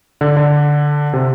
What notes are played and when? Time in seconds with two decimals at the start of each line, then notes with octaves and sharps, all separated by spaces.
0.21 D3
0.37 D3
1.13 C3